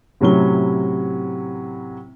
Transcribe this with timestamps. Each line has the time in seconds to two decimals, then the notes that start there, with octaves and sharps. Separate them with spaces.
0.21 A2 C3 F#3 C#4 E4 G7